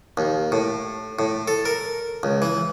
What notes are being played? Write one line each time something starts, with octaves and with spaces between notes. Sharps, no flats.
D#2
A2
A2
A4
A#4
C#2
E3